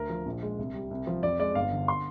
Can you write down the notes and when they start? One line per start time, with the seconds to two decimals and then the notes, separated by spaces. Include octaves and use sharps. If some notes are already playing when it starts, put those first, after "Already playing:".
Already playing: D2 A#4
0.10 F3
0.26 A#1
0.42 G#3
0.59 C2
0.74 G3
0.91 C2
1.07 F3
1.23 F2 D5
1.40 G#3 D5
1.55 G1 F5
1.72 D3
1.88 C6